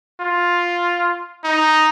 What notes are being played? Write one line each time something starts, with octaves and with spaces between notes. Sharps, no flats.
F4
D#4